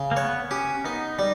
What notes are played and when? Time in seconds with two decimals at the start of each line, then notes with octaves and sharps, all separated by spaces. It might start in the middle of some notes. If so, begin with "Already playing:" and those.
Already playing: C#3
0.11 A#3
0.17 B3 C#5
0.51 C#4 G4
0.84 B3 D#4
1.19 G3